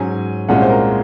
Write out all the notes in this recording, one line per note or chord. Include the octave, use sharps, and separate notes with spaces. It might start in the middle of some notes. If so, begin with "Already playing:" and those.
Already playing: G#2 F#3 C#4 G#5
C2 A#2 G#3 C#4 F#5
C5
A#4